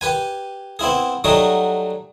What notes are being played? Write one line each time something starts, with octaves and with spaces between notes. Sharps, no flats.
G4 B4 G#5
B3 C4 E4 G#4
F#3 G3 A3 D#4 F#4 G#4